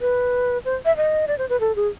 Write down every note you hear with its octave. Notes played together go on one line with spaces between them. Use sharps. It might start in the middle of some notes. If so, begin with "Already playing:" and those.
B4
C5
E5
D#5
D5
C5
B4
A4
G#4